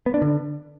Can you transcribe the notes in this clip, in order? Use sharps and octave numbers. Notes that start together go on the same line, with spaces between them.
B3
D4
D3